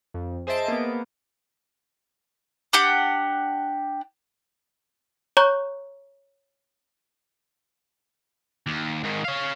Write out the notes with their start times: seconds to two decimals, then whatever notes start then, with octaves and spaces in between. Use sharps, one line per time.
0.14 F2
0.47 G#4 C5 D#5 E5 A5 D7
0.68 A#3 B3
2.73 D4 G4 F#5
5.37 C#5 A#5 C#6 F#6 G6
8.67 D#2
9.03 G#2 D#3
9.25 C#5 F5